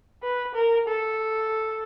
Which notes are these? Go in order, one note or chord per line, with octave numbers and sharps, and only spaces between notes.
B4
A#4
A4